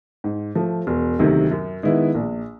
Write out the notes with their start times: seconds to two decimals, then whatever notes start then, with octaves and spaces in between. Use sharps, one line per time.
0.24 G#2
0.56 F3 A3
0.87 E1
1.19 D2 C3 D#3 F#3
1.51 F#2
1.83 D#3 G#3 B3 E4
2.15 A#1